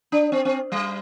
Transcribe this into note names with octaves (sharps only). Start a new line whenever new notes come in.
D4
C4
C4
G3